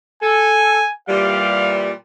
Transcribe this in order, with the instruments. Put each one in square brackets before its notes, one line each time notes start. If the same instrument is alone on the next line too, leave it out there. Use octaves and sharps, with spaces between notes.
[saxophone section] A4 [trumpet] G#5
[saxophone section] A#2 E3 G3 [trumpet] F5